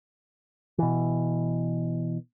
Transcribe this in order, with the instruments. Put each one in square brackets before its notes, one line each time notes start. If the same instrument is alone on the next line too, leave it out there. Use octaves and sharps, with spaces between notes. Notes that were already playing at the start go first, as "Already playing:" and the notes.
[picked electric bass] B2 E3